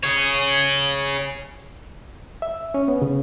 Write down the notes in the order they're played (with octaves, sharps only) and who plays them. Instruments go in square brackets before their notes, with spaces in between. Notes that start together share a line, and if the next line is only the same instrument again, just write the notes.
[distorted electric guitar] G#4 C#5
[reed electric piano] E5
C#4
B3
C#3